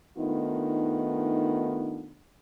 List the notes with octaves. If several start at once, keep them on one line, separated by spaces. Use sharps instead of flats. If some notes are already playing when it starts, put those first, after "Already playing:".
D#3 A3 B3 D4 D#4 F4